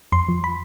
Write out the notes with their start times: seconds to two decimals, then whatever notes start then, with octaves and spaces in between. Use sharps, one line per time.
0.12 F2 C6
0.29 F3
0.44 B5